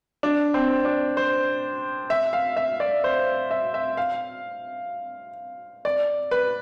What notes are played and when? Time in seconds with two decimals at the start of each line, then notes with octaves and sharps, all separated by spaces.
0.23 D4
0.54 C4
0.85 D4
1.17 C5
2.10 E5
2.33 F5
2.57 E5
2.80 D5
3.04 C5
3.51 E5
3.74 E5
3.97 F5
5.85 D5
6.31 B4